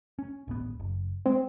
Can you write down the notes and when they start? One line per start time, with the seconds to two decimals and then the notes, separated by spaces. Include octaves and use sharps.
0.19 C#4
0.48 D1 G#1 B3
0.80 F#1
1.26 G#3 C4